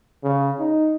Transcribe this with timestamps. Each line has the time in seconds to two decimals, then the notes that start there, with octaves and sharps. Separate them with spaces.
0.24 C#3
0.59 D#4